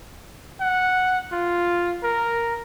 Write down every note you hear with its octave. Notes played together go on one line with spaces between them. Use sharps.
F#5
F4
A#4